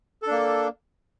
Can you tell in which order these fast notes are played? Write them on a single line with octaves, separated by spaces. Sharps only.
A4 D4 A#3